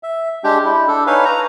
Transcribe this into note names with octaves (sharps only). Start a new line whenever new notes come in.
E5
G#3 D4 G4 G5
E4
D4 A4
D#4 B4 C#5 F5 G#5
A#5